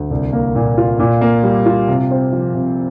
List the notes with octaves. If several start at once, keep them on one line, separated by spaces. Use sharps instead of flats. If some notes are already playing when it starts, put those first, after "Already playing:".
Already playing: D2
C2
A#3
A#2
F4
A#2
A#3
G3
F4
C3
C4
F3
C3